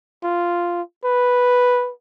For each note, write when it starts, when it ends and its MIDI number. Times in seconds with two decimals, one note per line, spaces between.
0.23 0.81 65
1.04 1.91 71